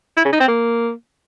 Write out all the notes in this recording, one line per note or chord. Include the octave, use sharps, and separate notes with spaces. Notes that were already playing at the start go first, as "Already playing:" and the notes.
E4
C#3
D#4
C4
A#3